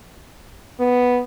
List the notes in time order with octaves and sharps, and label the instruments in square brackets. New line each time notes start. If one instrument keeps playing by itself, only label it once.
[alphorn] B3